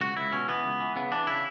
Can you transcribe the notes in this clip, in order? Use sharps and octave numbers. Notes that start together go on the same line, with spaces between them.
C#2 F#4
C#2 E4
B2 C#4
E3 B3
C#2
E3
C#3 B3
E3 D4
C#3 E4